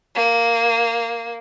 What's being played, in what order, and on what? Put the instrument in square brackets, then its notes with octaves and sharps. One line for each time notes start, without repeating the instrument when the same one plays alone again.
[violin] A#3